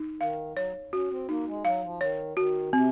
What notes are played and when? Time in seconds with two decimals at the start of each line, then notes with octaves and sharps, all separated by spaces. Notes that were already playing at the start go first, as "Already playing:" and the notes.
Already playing: D#4
0.20 D#3 F5
0.56 F#3 C#5
0.93 C#4 F#4
1.11 C4
1.29 A#3 D#4
1.47 G#3
1.65 F#3 F5
1.83 F3
2.01 D#3 C#5
2.37 D#3 F#4
2.73 C3 C4